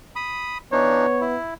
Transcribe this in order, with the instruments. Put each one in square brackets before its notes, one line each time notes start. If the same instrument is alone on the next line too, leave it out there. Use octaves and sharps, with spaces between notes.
[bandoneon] B5 D#6
[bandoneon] E3 D4 D#4 [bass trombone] B3 [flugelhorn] C#5
[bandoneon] E4